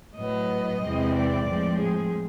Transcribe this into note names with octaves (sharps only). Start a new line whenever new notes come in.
A2 F#3 B3 D#5
E2 C3 E3 G#3 C4
D5
A2 F3 G#3 C4
G#4